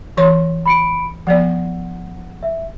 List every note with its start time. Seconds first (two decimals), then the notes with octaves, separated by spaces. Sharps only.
0.17 E3 C#5 C6
0.66 B5 C#7 D7
1.27 F3 B3 D5 F#5
2.43 E5